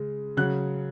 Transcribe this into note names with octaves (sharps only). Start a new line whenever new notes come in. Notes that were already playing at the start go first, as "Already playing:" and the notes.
Already playing: C#3 G#3
C#3 F#3 F#6